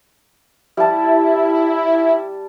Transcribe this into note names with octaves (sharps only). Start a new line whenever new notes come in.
G3 E4 A5